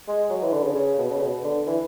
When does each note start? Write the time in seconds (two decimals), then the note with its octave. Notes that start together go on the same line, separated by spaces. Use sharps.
0.08 G#3
0.30 F#3
0.42 E3
0.53 D3
0.64 C#3
0.75 C#3
0.98 B2
1.11 C#3
1.21 B2
1.44 D3
1.67 E3